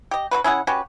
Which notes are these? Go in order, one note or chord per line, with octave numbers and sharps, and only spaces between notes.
G4 D#5
D3 D#4 F#4 B4
C#4 E4 G#4 F#5
C#4 F#4 G4 B4